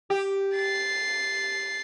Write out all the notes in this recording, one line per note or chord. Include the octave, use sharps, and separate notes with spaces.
G4
A6 C7